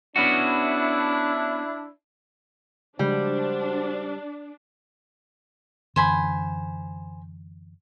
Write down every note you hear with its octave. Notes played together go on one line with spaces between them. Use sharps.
B3 C#4 D4 E4 F#4
C#3 F3 G3 G#3 D4 F#4 C5
F#2 D3 E3 C5 G#5 B5